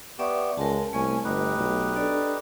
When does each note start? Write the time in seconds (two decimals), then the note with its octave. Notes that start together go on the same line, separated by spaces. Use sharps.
0.19 B3 G4 D5 E5 C#6
0.58 C#2 G#3 A#4 A5
0.93 C2 A3 C#4 G#5
1.25 G1 D#4 G4 B4
1.59 B1
1.95 D4 A4 D5